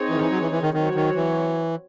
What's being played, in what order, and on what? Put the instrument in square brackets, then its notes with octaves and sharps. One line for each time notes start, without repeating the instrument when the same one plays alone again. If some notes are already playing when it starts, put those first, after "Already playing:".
Already playing: [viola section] C4 D#4 G#4 C#5
[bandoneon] E3
D#3
E3
F#3
E3
E3
D#3
[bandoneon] D#3 [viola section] F#3 C4 F#4 C#5
[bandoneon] D#3
E3